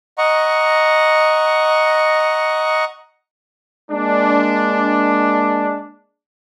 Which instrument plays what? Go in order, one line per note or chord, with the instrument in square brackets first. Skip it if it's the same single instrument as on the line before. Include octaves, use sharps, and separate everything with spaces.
[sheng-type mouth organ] D#5 F#5 A#5 C#6
[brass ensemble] G#3 A#3 D4